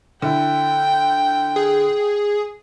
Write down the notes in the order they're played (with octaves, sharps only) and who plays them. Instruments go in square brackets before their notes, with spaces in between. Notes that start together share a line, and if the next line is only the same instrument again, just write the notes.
[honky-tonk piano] D3 E4 [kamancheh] G5
[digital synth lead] G#4